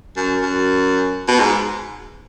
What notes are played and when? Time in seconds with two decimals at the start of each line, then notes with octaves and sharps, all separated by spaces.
0.16 F#2
0.41 F#2
1.28 B2
1.39 G#2